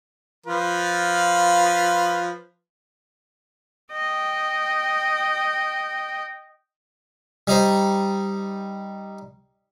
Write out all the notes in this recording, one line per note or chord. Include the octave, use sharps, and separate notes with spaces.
F3 F4 B4
D#5 G5
G3 D#4 C5